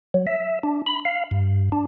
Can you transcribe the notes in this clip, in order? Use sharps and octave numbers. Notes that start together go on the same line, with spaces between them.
F#3
E5
D4
B5
F5
G2
D4